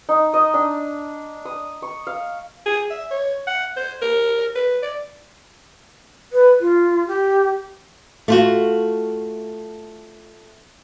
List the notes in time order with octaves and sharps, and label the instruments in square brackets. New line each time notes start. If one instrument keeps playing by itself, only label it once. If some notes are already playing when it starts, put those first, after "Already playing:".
[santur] D#4
D#5
D4
D#6
C#6
F5
[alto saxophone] G#4
E5
C#5
F#5
C5
A#4
B4
D5
[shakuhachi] B4
F4
G4
[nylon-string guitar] A3 F4 F#4